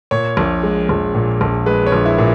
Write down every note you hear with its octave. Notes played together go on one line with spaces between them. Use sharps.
A#2 C#5
A#1
G#3
A#1
A#2
A#1
G#3 B4
C#5
A#1
E4
A#2